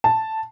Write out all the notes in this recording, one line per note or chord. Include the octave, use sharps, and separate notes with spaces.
A5